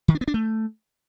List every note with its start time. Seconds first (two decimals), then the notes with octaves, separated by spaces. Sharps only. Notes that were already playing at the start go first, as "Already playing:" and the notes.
0.08 D#3
0.15 D4
0.21 B3
0.28 D4
0.34 A3